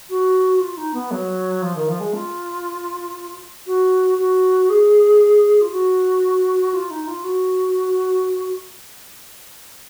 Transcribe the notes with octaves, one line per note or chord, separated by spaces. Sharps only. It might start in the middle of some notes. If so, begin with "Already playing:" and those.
F#4
F4
D#4
B3
F#3
F3
D#3
F3
G#3
F4
F#4
F#4
G#4
F4
F#4
F4
D#4
F4
F#4